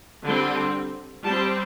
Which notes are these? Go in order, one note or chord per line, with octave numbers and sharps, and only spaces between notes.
D3 G3 C4
G3 C4 A5